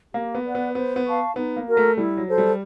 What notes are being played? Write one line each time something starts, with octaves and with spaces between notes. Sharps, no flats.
A#3 G4
B3
B4 D5 F#5
B3
B3 C5
B3
F5 A5 C#6
B3 D#4
A#3
F#4 A#4
A3
G3 E4
F#3
A4 C5
G3